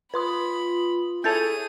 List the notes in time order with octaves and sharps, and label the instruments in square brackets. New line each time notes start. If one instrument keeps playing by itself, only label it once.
[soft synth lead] F4 [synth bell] B4 C6 D#6 [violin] B5
[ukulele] E4 A4 C#5 [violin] G#4 D#7 [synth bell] G6 A6 F7